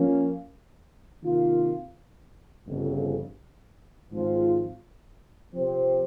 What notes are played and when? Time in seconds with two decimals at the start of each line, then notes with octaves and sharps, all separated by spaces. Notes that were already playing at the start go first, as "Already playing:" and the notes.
Already playing: F3 A#3 C#4
1.23 C3 D#3 A#3 F4
2.67 G1 F2 C#3
4.11 G#1 G#2 F3 C4 F4
5.54 C3 F3 C4 G4 C5